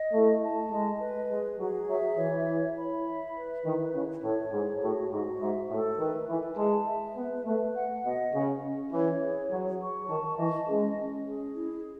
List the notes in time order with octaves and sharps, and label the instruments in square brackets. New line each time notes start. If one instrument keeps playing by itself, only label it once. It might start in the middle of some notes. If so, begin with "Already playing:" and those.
Already playing: [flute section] D#5
[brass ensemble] A3 [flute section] E4
[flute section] A5
[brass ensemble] G#3 [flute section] D#5
[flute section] B4
[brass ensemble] G#3 [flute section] G#4
[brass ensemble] F#3 [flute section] G#4
[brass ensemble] F#3 [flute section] E5
[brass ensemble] E3 [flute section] C#5
[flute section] E4
B5
E5
B4
[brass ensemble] D#3 [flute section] E4
[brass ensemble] C#3 [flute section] E4
[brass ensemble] A2 [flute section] C#5
[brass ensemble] G#2 [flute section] G#4
[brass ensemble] A2 [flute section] F#4
[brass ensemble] G#2 [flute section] F#4
[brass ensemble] G#2 [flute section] E5
[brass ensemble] A2 [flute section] A4
[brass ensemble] D#3 [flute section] B4
[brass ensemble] E3 [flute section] B4
[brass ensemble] G#3 [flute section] A5
[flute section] E5
[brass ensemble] B3 [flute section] B4
[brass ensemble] A3 [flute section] B4
[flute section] F#5
[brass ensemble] B2 [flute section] D#5
[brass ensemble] C#3 [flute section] C#4
[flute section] C#4
[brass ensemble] E3 [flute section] C#5
[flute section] G#4
[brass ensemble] F#3 [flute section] G#4
[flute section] C#6
[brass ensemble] D#3 [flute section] A5
[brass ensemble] E3 [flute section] D#5
[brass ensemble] G#3 [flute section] C#4
[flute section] C#4
G#4
E4